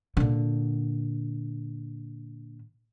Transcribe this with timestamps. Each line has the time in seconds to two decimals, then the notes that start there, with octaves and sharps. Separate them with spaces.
0.17 A#2 D3